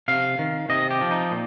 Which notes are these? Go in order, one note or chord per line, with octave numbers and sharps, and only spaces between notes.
C3 F5
D#3
C3 D#5
G4
F3
D#4
A#2